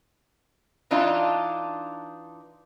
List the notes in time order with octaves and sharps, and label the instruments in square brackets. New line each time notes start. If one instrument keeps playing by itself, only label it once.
[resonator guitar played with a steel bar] E3 D4 D#4 F4